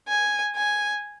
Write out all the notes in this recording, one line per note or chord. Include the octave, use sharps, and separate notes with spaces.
G#5
G#5